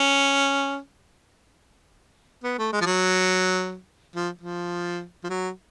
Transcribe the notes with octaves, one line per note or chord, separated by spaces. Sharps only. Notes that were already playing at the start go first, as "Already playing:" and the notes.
Already playing: C#4
B3
A3
G#3
F3
F#3
F3
F3
F3
F#3